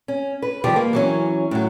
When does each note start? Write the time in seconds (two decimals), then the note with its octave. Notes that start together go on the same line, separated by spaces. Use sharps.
0.08 C#4
0.42 B4
0.64 D#3 F3 G3 G4
0.76 A#3
0.93 E3 F#3 C#4
1.51 A2 F#3